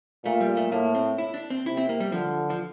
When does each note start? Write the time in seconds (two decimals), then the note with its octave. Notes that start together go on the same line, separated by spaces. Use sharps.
0.25 A#2 A3
0.40 G3
0.57 A3
0.72 A2 A#3
0.95 C4
1.18 E4
1.34 D4
1.50 C4
1.65 C3 E4
1.77 C4
1.89 A#3
2.00 G3
2.12 D3 F3
2.50 F3